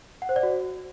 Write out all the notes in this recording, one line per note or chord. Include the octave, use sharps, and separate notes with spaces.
F#5
C5
D5
F#4